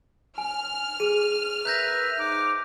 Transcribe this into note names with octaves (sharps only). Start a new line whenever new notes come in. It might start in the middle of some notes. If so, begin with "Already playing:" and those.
G#5 F6
G#4 D#7
A#4 B4 E5 F#6 G6 A#6
G#2 D#4 D6